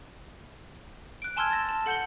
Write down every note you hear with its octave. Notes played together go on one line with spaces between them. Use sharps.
F#6 D7
G#5 A5 C6 E6 F6 G#6
A6 A#6 E7
A5
A4 F#5 G6 F#7 G7